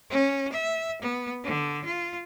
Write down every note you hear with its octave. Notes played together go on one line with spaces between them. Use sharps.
C#4
E5
B3
D3
F4